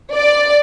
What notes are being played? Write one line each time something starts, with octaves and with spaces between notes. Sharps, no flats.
D5